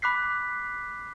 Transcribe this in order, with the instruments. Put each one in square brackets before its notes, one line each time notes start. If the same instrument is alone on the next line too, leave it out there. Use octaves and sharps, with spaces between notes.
[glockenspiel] B5 D6 F#6 B6 C7